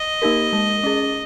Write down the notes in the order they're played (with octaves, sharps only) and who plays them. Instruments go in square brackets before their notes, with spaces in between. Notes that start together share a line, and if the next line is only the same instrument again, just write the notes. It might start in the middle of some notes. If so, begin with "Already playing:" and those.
Already playing: [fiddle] D#5
[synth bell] A#3 D#4 G4 A#4
G#3
C#4 G#4